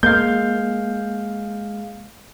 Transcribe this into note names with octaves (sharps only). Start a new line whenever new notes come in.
G#3 A#3 F5 G6